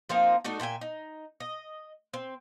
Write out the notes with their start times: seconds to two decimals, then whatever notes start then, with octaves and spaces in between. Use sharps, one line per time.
0.09 F3 A#3 C4 D#4
0.44 A3 D4 D#4 F#4
0.60 A#2 E5 G5 G#5
0.81 D#4
1.40 D#5
2.14 C4